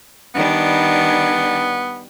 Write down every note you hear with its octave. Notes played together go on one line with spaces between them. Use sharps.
D#3 G3 B3 D4